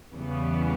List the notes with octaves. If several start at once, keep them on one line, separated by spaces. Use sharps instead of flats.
E2 C#3 E3 G3 B3